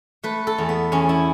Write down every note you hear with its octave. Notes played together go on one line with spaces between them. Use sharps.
A3 B4
A4
E2
B3
E2 C#4
E4